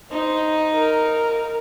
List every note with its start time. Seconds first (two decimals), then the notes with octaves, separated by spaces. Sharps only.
0.11 D#4 C5
0.75 A#4